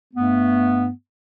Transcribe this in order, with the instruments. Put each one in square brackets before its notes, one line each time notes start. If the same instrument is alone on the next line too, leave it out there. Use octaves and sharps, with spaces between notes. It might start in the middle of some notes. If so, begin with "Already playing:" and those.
[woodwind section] G2 A3 B3